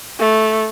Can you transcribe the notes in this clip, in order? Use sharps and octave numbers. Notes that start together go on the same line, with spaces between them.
A3